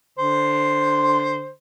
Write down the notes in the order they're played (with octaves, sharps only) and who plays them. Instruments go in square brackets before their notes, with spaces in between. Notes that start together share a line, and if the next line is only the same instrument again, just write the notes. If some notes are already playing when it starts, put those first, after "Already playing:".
[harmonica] D3 C5